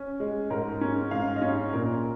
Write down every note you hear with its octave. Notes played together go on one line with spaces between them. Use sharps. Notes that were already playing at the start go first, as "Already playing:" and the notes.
Already playing: C#4
G#3
G#2 A#4
C#4 C#5
G#2 F5
D#5
C#4 C#5
A#2 A#4